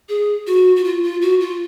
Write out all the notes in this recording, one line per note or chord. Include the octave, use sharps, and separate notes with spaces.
G#4
F#4
F#4
F4
F4
F#4
F4